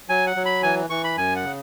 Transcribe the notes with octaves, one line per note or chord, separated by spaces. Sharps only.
F#3 G#5
F#5
F#3
B5
E3 G#5
E3 C#6
B5
F#2 G#5
F#5
C#3